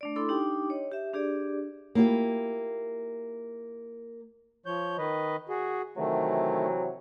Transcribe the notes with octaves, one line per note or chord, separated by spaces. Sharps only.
A3 D4 D5
E4 A4 B5 C6 D6
D4 D#4 G4 G5 D6
C#5 D#5
G4 E5
D4 G4 G#4 D5
A#3 E4 F4 G4
F3 C#5 G6
D#3 B4 D#5
F#4 G#4
C3 D#3 E3 F#3 A3